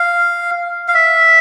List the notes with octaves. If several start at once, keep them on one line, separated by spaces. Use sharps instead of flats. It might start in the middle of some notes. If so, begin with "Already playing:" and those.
Already playing: F5
F5
E5